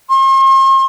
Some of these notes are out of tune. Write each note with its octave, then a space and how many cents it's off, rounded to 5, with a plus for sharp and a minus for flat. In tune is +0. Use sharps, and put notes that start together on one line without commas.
C6 +45